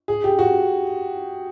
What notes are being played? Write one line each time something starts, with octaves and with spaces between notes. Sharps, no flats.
G#4
G4
F#4